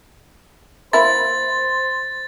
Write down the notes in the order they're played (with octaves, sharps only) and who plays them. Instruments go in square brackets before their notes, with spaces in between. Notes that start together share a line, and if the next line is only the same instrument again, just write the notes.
[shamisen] A#3 E4 [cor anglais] C5 [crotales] A6